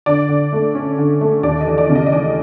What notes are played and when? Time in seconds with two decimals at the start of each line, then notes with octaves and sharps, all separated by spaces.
0.06 D3 D5
0.29 D3
0.53 A3
0.75 C#4
0.98 D3
1.21 A3
1.43 D#2 D5
1.61 D#5
1.67 E3
1.78 D5
1.89 C#3
1.95 D#5
2.06 D#5
2.12 E3 D5